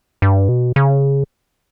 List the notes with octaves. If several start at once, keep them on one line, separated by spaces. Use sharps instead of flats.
G2
B2
C#3